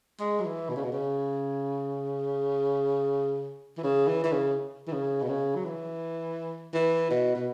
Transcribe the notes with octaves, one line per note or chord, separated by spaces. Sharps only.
G#3
F#3
E3
B2
C#3
B2
C#3
E3
C#3
E3
E3
C#3
E3
C#3
B2
C#3
F#3
E3
E3
B2
B2